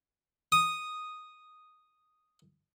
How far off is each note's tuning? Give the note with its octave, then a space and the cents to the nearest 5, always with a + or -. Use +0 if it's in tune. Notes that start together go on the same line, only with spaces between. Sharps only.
D#6 +0